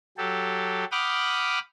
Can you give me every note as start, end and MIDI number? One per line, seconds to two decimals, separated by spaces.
0.18 0.85 54
0.18 0.85 67
0.18 0.85 69
0.92 1.59 78
0.92 1.59 79
0.92 1.59 83
0.92 1.59 86
0.92 1.59 87
0.92 1.59 89